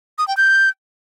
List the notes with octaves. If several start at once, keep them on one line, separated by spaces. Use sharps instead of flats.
D#6
G5
G6